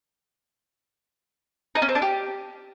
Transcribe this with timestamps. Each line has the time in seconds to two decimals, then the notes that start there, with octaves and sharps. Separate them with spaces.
1.75 D#4
1.82 C#4
1.89 C4
1.95 D4
2.02 G4